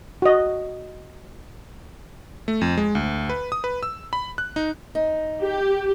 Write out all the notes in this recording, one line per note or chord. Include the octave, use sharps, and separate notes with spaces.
F#4 D#5
A3
F2
G#3
D2
B4
D#6
B4
E6
B5
F#6
D#4
D#4
G4